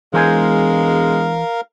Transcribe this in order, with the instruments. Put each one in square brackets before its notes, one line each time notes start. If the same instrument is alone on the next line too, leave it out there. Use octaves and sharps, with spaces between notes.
[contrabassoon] E1 [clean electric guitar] E3 C5 G#5 [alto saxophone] G#3 [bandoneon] A#4 F5